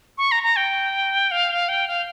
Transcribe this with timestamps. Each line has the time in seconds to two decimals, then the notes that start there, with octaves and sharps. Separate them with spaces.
0.18 C#6
0.32 A#5
0.43 A#5
0.56 G5
1.31 F5
1.69 G5
1.88 F5